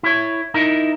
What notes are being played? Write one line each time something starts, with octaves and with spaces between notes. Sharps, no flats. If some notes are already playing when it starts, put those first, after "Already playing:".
E4 C#5
D#4 E4 A#4